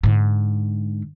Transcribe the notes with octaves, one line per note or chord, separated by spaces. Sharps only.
G#2 D3